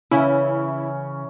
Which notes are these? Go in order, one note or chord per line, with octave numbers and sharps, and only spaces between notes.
C#3 E3 C#4 E4